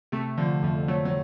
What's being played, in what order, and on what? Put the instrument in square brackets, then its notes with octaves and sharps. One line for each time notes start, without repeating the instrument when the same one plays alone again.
[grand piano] C3 [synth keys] A3
[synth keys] D3 [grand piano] F3
[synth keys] F2 [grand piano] F3
[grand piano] F#3 [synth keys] A3
[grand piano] F#3